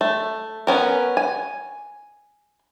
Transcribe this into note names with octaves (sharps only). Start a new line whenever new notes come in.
A3
B3 C#4 A#4
G#5